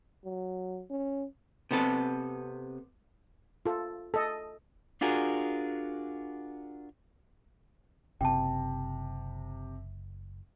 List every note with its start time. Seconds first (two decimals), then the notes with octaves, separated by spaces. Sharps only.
0.24 F#3
0.91 C#4
1.71 C3 B3 A4
3.66 F4 A4
4.14 A4 D#5
5.01 D4 F4 F#4 G#4 A#4
8.21 F#1 C3 G5 A5